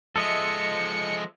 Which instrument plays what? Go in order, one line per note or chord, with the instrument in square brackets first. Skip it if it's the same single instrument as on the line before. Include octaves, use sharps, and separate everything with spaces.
[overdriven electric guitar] F3 G#3 [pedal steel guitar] A4 D#5 E5 [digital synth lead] C#7